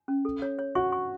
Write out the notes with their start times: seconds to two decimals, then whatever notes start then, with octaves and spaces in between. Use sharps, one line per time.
0.08 C#4
0.25 A4
0.42 C#5
0.59 C#5
0.75 F#4 C#6
0.92 C#6